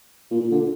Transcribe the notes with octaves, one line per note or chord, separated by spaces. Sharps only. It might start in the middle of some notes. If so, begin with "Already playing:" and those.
A#2
A#2
D3